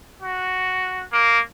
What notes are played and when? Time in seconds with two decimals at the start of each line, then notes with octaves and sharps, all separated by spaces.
0.22 F#4
1.13 A#3